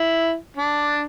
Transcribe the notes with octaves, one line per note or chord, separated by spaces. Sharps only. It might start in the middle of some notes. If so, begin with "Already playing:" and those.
Already playing: E4
D4